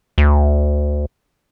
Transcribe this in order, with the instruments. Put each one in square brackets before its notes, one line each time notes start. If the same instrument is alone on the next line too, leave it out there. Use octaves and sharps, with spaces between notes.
[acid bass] D2